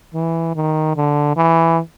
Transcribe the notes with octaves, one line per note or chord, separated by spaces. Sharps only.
E3
D#3
D3
E3